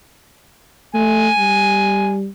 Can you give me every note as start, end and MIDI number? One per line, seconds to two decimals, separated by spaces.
0.94 1.29 57
0.94 2.14 80
1.38 2.28 55